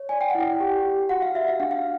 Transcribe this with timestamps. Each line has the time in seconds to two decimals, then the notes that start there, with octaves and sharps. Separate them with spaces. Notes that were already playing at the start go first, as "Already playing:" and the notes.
Already playing: C#5
0.09 D5 G#5
0.21 G5
0.30 E4 F#5
0.40 G5
0.60 G4
0.85 G4
1.09 F#4 F#5
1.22 F5
1.35 F#4 E5
1.48 F5
1.60 D4 F#5
1.71 F5